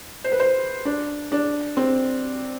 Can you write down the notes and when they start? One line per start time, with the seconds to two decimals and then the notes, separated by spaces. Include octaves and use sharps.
0.24 C5
0.32 B4
0.40 C5
0.85 D4
1.32 D4
1.77 C4